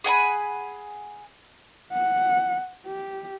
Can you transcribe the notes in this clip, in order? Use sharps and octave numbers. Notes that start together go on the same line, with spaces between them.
G#4 F#5 G#5 B5
F#5
G4